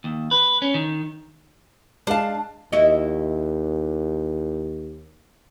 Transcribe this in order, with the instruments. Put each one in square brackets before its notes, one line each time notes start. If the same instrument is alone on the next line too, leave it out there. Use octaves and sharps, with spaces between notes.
[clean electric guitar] D#2
B4
C#4
D#3
[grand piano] G#3 F5 [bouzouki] D4 A5
[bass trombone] D#2 [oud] E4 F#4 D#5